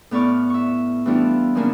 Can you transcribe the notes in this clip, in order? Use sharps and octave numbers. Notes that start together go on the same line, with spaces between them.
A2 B3 D5 C#6 F6
E5 C#6
E3 G3 A3 B3 D4 F4
C#3 F3 F#3 A#3 B3 D4